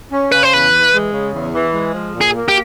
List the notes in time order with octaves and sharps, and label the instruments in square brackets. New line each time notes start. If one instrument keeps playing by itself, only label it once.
[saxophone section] C#4
[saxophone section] C#3 [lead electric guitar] B4
[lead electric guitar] C5
[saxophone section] E2 [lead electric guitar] B4
[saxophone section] E3
G#3
C#3
E2
E3
G#3
F3
A#2
[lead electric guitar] G#4
[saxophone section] A#3
[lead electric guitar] G4